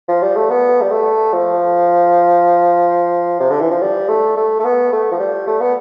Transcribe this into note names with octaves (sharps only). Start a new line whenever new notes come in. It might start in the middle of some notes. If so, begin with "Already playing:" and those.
F3
G3
A3
B3
G3
A3
F3
C3
D3
E3
F3
G3
A3
A3
A3
B3
A3
F3
G3
A3
B3